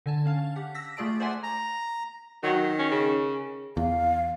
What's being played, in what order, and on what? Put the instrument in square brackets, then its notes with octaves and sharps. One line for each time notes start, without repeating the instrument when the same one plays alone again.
[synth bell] D3 G#5 A5
C#4 F5 A5
G4 F#5
E6 A#6 B6
A3 F4 G#4 D5 A5 D7
C5 D5 E5 F#5 G#5 C6
[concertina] A#5
[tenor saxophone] D#3 [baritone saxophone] F#3
[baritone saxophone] C#4
C#3
[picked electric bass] E2 [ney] F5